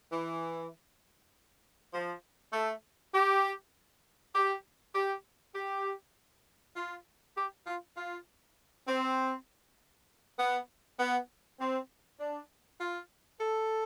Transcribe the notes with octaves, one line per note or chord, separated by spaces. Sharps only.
E3
F3
A3
G4
G4
G4
G4
F4
G4
F4
F4
C4
B3
B3
C4
D4
F4
A4